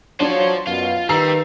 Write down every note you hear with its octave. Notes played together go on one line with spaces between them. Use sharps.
F#3 D4 F4 C5 C#5
F#2 B2 F4
D#3 G3 B4 A#5 E6 C7